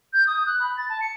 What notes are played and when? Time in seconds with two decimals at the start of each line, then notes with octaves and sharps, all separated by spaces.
0.13 G6
0.27 D#6
0.47 F#6
0.60 B5
0.77 A6
0.89 A5
1.01 C#7